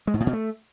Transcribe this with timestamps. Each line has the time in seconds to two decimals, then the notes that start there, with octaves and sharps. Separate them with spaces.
0.07 G#3
0.14 G#2
0.20 A2
0.27 B2
0.33 A3